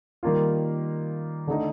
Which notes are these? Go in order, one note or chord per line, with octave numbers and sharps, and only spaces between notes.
D#3 G3 A#3 F4
D3 A3 D#4